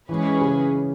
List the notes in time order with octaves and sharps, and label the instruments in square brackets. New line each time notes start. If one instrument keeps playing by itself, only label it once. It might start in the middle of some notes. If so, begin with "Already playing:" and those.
[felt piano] E3 [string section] G#3 C#4 G#4 B4
[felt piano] C#3